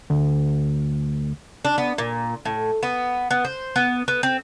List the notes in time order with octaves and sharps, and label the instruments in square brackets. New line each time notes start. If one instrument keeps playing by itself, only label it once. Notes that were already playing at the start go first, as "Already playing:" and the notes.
[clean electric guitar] D2
[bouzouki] D4
B3
A#2
A2
B3
B3
C5
B3
B3
C4